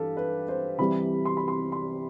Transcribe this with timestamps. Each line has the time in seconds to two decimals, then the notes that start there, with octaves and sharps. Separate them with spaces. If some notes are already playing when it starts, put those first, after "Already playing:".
Already playing: G2 E3 G4 A4 F5
0.17 B4
0.49 C5
0.79 C2 C3 E3 G3 B5
1.25 C6
1.37 B5
1.48 C6
1.72 C6